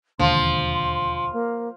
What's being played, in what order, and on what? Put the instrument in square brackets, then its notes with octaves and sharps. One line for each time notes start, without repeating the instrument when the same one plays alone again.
[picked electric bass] E1 D#2 D3 [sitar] F3 [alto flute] C6
[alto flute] A#3